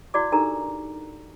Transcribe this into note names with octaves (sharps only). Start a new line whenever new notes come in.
E4 F#4 D5 D6
D4 D#4 G4 A4 A#4 A#5